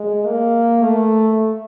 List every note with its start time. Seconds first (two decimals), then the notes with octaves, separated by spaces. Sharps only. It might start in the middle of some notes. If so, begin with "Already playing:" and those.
Already playing: G#3
0.27 A#3
0.82 A3